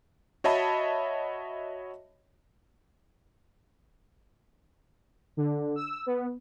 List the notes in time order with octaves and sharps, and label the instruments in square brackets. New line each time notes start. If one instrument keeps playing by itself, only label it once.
[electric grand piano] F#4 C#5 D#5 E5 A5 B5
[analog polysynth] D3
E6
B3